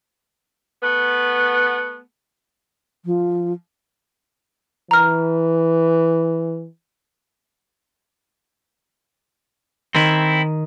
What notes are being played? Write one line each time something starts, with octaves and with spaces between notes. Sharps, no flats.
A3 B3
F3
E3 A#5 F6
D#3 C4 E4